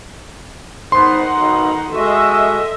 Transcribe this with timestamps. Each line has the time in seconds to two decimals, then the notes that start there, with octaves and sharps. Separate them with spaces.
0.92 G#1 D#3 B3 D#4 C5 F#5 C6
1.36 B1
1.94 G#3 A3 F#4 A4 D#5 E5